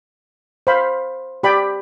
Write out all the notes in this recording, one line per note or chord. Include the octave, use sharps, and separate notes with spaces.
C5 F5 B5
G4 D5 G5 B5